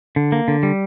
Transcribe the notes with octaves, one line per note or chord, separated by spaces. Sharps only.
D3
A#3
D3
G3